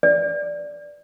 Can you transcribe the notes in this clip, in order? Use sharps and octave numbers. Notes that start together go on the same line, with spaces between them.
D5